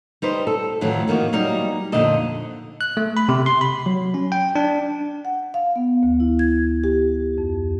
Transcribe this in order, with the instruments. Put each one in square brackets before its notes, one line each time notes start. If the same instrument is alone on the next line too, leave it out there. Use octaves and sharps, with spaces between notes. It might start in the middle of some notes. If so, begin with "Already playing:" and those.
[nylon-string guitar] G3 D#4 B4 C5
A4
F2 A2 D#3 E3 F#3
F2 D#3 A#3 F#4
F#3 G3 A#3 D#4
F2 A#2 D3 D#4 D#5 A5
[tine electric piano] F#6
A3
B5
C3
C6
B5
F#3
C#4
G5
D4
[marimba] F#5
F5
B3
D2
E4
G#6
G4
F2